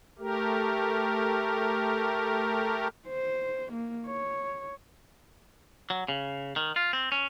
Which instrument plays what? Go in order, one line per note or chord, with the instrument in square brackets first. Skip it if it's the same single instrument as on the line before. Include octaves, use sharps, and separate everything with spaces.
[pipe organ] A3 G4 A#4
[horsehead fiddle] C5
A#3
C#5
[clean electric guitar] F#3
C#3
D#3
F4
C4
C#4